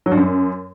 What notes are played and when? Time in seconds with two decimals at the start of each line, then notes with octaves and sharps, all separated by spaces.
0.06 F#3
0.12 G2
0.17 F#2